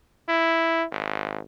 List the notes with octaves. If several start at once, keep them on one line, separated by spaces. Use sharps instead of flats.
E4
G#1